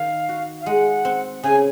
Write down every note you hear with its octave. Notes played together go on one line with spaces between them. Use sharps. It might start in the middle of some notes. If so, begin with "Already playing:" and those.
Already playing: D#3 F5
F#4
F5
G#3 F#5
C4
C#3 G#5